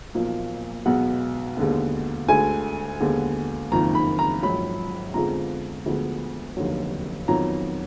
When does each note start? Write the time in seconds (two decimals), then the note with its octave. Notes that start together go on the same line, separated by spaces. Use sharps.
0.14 B1 A#2 F3 A#3
0.86 B1 B2 G#3 B3 F#5
1.57 D#2 D3 G#3 B3
2.28 D2 D3 G#3 G#5
3.00 D#2 D3 G#3 B3
3.71 F#1 F2 D#3 A#3 A#5
3.95 B5
4.19 A#5
4.43 A#1 G#2 F#3 B5
5.14 F2 D3 F3 G#3 B3 A#5
5.86 D2 D3 F3 G#3 B3
6.57 F1 D#2 D3 F#3
7.28 F2 D#3 F#3 B3 A#5